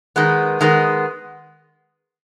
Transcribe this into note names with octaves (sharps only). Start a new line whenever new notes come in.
D#3 G#3 B3
D#3 G#3 B3